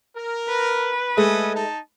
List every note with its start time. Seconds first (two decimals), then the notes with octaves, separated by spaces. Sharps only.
0.17 A#4
0.48 B4
1.17 G#3 A3 A4 G#5 D#6
1.55 D#4 A5